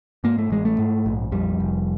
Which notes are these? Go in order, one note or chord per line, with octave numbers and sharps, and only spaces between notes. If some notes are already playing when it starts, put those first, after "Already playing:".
G#2 A#3
A3
A1 G#3
A3
G#2
A#1
F2 G3
F1